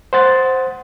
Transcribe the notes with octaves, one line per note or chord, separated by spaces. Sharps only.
C5 F#5 A6